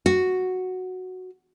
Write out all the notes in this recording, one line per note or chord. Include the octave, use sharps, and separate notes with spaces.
F#4